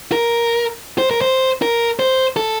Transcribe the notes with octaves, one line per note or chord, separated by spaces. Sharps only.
A#4
C5
A#4
C5
A#4
C5
A4